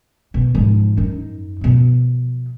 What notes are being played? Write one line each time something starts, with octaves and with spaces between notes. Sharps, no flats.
B2
G#2 F3
F#2 D#4
B2 F3